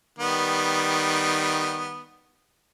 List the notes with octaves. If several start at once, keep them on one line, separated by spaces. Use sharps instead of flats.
D#3 G3 B3